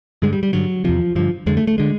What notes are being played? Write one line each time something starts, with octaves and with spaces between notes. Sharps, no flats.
G2 D3 G#3
G3
G3
G2 D3 F#3
E2 C3 F3
G2 D3 F3
F2 D3 G#3
A3
A3
D3 G#3